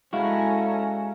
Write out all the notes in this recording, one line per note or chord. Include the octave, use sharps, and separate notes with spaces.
G#3 C#4 E4 F#4 A4 F5 G#5 A#5